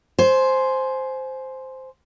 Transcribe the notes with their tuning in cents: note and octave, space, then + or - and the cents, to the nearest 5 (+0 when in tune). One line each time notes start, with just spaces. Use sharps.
C5 +0 G#5 +25